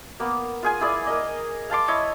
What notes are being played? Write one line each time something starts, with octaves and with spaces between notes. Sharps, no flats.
A#3 B3
F4 G#4 G#5
E4 G#4 D5
A#4 D#5
F5 A5 C6 D6
E4 C#5 D#5